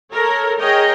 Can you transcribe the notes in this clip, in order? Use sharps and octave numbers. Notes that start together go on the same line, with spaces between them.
A4 A#4 C#5
G#4 A#4 C#5 D#5 G5